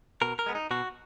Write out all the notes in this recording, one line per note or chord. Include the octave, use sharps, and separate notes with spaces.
B2 A#4
A#4
G#3 B3
D#4
B2 F#4